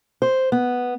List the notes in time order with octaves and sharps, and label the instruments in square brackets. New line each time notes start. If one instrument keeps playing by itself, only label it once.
[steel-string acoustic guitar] C5
B3